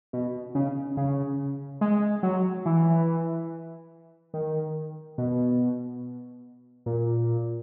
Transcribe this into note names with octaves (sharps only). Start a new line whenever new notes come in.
B2
C#3
C#3
G#3
F#3
E3
D#3
B2
A#2